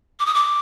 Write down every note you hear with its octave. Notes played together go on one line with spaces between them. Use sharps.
D6
D#6
D6